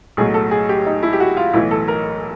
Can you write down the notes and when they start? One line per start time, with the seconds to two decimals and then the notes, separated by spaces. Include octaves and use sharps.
0.17 B1 A2 F#3 G#4
0.34 A4
0.51 G#4
0.69 G4
0.86 D#4
1.03 E4
1.13 G4
1.20 F#4
1.37 F4
1.53 B1 A2 E3 E4
1.71 A4
1.88 A#4